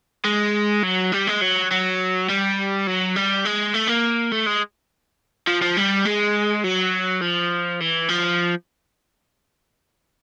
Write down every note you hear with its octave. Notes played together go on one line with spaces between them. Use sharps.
G#3
F#3
G3
G#3
F#3
F#3
G3
F#3
G3
G#3
A3
A#3
A3
G#3
F3
F3
G3
G#3
F#3
F3
E3
F3